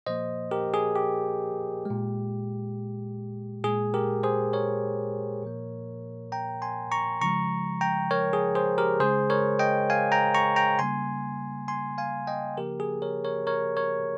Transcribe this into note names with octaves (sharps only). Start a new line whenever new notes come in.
A#2 F3 A#3 C5 D#5
G4 A#4
G#4
G4
A#2 G#3
A#2 G#3 G#4
G4 A#4
G#4 C5
A#4 C#5
A#2 F3 A#3
G5 A#5
G#5 C6
A#5 C#6
C#3 F3 G#3 A#5 C#6
G5 A#5
A#4 C#5
G#4
G#4 C5
G4 A#4
C#3 G#3 G#4 C5
A#4 C#5
D#5 G5
F5 G#5
G5 A#5
A#5 C#6
G5 A#5
C#3 G3 A#3 G#5 C6
G#5 C6
F5 G#5
D#5 G5
C#3 F3 A#3 G4 A#4
G#4
A#4 C#5
A#4 C#5
A#4 C#5
A#4 C#5